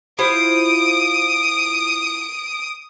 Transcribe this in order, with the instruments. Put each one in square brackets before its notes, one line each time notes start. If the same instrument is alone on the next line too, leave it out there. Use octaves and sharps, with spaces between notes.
[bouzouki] E4 F4 C5 [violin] D#6 D7